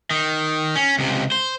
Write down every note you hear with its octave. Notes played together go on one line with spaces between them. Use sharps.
D#3
C#4
C#2 C3
C5